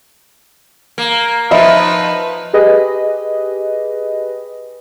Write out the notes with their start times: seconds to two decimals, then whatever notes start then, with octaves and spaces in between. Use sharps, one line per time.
0.98 A#3
1.51 F3 D#4 B4 D#5 E5 B5
2.53 G4 G#4 B4 D#5